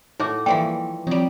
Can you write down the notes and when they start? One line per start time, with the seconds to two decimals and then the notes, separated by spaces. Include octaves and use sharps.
0.20 A2 D#4 F#4 C#5 D6
0.46 E3 F3 G3 A#3 E5 G5 C#6
1.07 F3 G3 C4 D#4 C#5